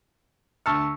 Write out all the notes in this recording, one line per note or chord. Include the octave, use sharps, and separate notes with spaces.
D2 A5 C#6 E6 F6 C#7